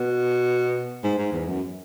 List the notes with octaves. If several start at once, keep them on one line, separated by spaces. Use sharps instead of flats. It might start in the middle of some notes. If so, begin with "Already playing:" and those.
Already playing: B2
G#2
G#2
E2
F#2